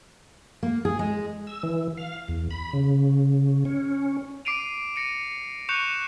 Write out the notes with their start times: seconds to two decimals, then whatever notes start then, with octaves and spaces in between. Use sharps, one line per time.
0.63 A#3
0.85 G#4
0.99 G#3
1.47 E6
1.63 E3
1.98 F5
2.28 E2
2.51 B5
2.73 C#3
3.65 C#4
4.45 D6 C7 D7 D#7 F7
4.96 A#6 C#7 D#7
5.69 C#6 F#6 G6 C#7 E7 F7